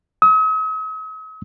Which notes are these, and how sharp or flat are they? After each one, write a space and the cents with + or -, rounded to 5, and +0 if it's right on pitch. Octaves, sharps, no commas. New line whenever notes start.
D#6 +45